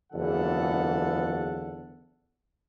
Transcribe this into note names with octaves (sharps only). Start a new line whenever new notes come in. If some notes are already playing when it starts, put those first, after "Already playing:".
F#1 E2 D3 F3 A4 F#5